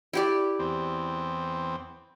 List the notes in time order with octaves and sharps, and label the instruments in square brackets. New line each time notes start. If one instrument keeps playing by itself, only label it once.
[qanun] E4 G4 D5
[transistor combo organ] E2 C4